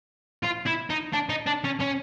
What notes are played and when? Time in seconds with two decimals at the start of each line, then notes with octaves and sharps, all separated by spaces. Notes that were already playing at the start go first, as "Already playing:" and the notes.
0.44 F4
0.66 E4
0.90 D#4
1.13 D4
1.29 D#4
1.47 D4
1.65 C#4
1.81 C#4